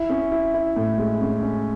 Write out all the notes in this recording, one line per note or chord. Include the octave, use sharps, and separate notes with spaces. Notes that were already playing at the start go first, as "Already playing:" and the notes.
Already playing: E4
C#4
E4
E4
A2
G#3
C#4
C#4